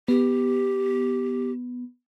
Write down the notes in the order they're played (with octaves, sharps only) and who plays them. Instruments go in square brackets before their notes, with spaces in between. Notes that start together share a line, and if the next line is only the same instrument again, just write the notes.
[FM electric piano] B3 [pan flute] G4